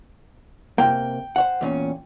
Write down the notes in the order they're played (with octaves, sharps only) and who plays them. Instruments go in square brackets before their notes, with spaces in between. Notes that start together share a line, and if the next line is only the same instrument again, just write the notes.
[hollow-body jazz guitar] C3 A#3 [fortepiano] G5
[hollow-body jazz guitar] C5 C#5 F#5
E2 A#2 C#4